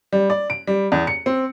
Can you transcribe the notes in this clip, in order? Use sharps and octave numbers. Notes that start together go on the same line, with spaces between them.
G3
D5
D7
G3
E2
C#7
C4